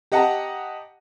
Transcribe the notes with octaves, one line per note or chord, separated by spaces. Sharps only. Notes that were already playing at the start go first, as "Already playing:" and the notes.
G4 D#5 F#5 A5 A#5